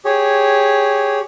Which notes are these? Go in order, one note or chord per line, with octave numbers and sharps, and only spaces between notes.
G4 G#4 C#5